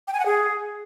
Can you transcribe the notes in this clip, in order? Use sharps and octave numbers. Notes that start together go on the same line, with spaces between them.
G5
G#5
F#5
G#4